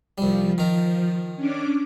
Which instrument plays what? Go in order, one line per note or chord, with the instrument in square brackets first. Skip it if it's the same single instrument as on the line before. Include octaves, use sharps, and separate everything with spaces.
[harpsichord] C2 G3 [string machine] F3
[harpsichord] D#3 A#4
[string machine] C#4 D4 D6